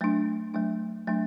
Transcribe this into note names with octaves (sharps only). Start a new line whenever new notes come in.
F#3 A3 D4
F#3 A3 D4
F#3 A3 D4